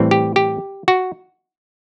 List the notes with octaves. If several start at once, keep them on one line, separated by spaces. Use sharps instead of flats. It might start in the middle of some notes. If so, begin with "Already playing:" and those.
Already playing: A2 E3 G3 C4
G4
G4
F#4